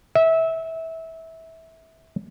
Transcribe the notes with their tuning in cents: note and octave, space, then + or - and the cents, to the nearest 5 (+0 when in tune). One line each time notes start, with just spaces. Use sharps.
E5 -20